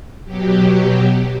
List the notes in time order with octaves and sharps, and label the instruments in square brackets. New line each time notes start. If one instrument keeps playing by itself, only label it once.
[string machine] B2 F#3 G4